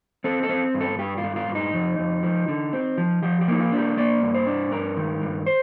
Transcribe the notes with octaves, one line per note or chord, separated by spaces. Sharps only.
C4 A4
A4
C4
G2
A4
G2 G4
F4
G2
F4
G2
D#4
F2
F2
F3
D3
C4
F3
F3 G4
G4
A#3 D#4
F4
D4
G4
A#3 D5
G2
C5
D4
G2 A#4
D#3
G2
C5